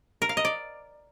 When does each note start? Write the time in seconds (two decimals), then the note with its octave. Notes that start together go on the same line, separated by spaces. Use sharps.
0.22 A#4
0.29 F5
0.37 D#5
0.45 D5